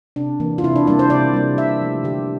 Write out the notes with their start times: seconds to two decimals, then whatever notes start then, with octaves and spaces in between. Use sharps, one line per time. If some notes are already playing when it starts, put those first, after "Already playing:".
0.16 C3 D4
0.40 E3 A#3
0.58 F4
0.63 C3 E4
0.76 D4
0.87 G3 A#3 D4
0.99 C5
1.10 C3 D5
1.33 G3 A#3
1.57 C3 E5
1.81 F3 A3
2.04 D3 G4